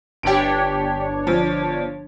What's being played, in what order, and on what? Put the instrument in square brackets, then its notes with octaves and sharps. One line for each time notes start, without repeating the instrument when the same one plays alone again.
[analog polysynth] G1 D4 C#5 [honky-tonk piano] G4 D7
[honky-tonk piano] F3